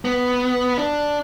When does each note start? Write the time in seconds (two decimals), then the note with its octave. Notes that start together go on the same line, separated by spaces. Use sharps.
0.05 B3
0.78 D4